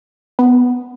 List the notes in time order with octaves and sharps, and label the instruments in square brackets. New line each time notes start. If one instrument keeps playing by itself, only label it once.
[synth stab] B3